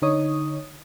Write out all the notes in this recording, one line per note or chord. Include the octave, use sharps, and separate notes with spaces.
D3 D#4 C#5 D#6